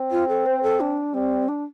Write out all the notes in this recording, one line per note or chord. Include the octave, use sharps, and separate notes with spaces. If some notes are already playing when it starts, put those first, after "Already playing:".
Already playing: C4
F4
A4
C5
A4
D4
G3 C4
D4